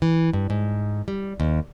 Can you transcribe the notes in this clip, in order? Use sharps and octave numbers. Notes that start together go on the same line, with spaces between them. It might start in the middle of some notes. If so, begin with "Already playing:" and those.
E3
G2
G#2
G3
D#2